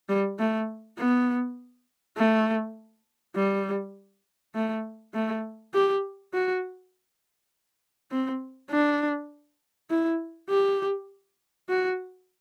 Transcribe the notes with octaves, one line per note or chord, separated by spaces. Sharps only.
G3
A3
B3
A3
G3
A3
A3
G4
F#4
C4
D4
E4
G4
F#4